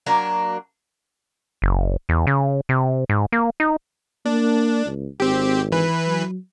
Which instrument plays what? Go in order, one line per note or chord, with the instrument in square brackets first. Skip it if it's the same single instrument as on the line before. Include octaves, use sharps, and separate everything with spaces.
[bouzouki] F#3 A#3 D4 A#4
[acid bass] F#1
E2
C#3
C3
G#2
A#3
D#4
[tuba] A#3 [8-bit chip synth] D4
[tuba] C#2
[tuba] G#1 [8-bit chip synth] C4 G4
[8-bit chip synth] E3 B4
[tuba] F#3